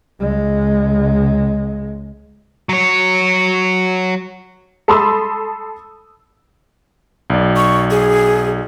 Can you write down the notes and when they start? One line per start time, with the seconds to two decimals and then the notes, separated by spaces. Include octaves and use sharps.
0.21 C#2 G#3
2.69 F#3 C#5
4.88 A4 A5 B5 C6 D#6 E6
7.30 B1 D5
7.56 C#6
7.90 G#4